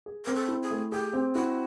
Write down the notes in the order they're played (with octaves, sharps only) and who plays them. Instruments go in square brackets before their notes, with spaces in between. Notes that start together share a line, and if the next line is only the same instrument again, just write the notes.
[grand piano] G#4
[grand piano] C4 [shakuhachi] A#4
[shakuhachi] A4
[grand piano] E4
[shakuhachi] G#4
[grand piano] A3
[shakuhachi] G4 [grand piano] G#4
[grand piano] C4
[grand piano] E4 [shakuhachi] F#4